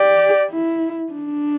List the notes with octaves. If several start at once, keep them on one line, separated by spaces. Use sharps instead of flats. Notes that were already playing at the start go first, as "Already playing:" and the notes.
Already playing: G4 D5
E4
D4